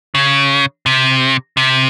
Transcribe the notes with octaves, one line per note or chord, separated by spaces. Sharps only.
C#3
C3
C3